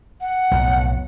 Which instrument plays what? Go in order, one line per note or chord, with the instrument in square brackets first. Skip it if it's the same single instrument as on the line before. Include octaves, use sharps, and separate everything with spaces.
[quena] F#5
[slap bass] B1 F2 A2